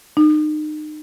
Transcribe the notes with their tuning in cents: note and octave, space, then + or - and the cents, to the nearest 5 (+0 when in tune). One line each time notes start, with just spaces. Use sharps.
D#4 -35